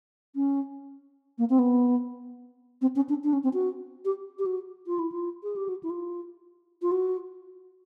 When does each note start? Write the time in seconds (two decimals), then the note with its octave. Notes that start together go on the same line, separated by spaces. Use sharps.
0.35 C#4
1.38 A#3
1.50 C4
1.59 B3
2.82 C4
2.96 C#4
3.09 D4
3.24 D4
3.33 C#4
3.44 C4
3.53 F#4
4.05 G4
4.39 G4
4.46 F#4
4.87 F4
4.99 E4
5.12 F4
5.43 G#4
5.56 G4
5.69 F#4
5.83 E4
5.90 F4
6.82 F4
6.92 F#4